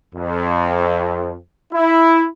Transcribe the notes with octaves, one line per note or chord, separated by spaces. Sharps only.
F2
E4